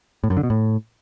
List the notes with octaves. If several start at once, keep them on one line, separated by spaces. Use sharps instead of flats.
A2
F#2
D3
B2
A2